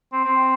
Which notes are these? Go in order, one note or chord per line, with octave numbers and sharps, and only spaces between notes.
C4
C4